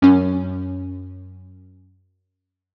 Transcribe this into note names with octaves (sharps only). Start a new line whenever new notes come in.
F#2 C#4